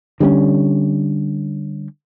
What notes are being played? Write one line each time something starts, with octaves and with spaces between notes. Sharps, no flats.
D3 G3 A#3 C#4